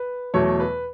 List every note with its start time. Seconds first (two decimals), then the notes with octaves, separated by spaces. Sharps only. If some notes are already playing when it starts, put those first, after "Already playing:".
Already playing: B4
0.34 E2 B2 F#3 A3 C#5
0.60 B4